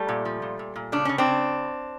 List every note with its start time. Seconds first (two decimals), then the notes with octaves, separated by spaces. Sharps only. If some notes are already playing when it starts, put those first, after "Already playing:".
Already playing: G3 A3
0.09 A#2
0.25 F3
0.42 A#2
0.59 A#2
0.76 A#2
0.92 C#3 D4
1.05 C#3 C#4
1.18 C4 D4
1.26 C#3